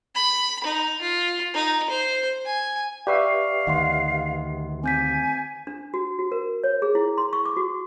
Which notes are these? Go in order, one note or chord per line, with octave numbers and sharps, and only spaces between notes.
B5
D#4
F4
D#4
C5
G#5
G4 B4 D5 E5 F5 C#6
D2 D#3 D#5 F#5 C6
C4 G#5 G6 B6
D4
F#4
F#4
A#4
C#5
G#4
E4
C6
C#6
D6
F#4